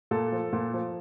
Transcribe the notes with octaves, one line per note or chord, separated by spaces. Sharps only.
A#2 A4
F3
A#2
F3